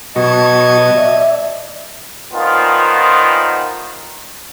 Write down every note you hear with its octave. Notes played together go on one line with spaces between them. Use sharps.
B2 F#3 F#4 D#5 A5 C#6 G#6
D5 E5
A#2 D#3 F3 B3 F4